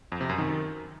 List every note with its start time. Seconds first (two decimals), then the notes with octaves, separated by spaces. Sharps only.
0.12 F2
0.21 C3
0.29 F#2
0.38 D#3